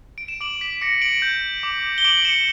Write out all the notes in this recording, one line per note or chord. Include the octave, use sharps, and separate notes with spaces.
D7
E7
D6 D7 F#7
B6 D7
D6 A#6 C#7
D7 F#7
G6
D6
G7
D6 D7 F#7
C#7 E7